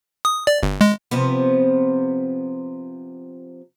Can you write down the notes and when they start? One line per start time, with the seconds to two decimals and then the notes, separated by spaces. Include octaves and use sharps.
0.25 D#6
0.47 D5
0.63 G1
0.81 G#3
1.11 C3 F3 B3